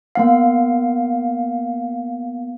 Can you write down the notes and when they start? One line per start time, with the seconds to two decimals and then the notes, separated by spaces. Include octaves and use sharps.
0.15 A#3 B3 F5